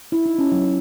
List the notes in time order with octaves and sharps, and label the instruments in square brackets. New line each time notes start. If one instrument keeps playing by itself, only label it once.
[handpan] E4
D#4
C#4
F#3